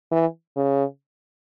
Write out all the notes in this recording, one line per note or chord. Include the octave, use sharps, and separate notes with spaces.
E3
C#3